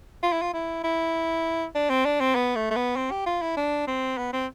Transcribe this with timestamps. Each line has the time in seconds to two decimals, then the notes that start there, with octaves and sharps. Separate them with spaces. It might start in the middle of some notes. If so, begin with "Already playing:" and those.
0.23 F4
0.33 E4
0.42 F4
0.53 E4
0.84 E4
1.75 D4
1.90 C4
2.05 D4
2.20 C4
2.35 B3
2.56 A3
2.71 A3
2.76 B3
2.96 C4
3.11 G4
3.26 F4
3.42 E4
3.57 D4
3.87 C4
4.18 B3
4.33 C4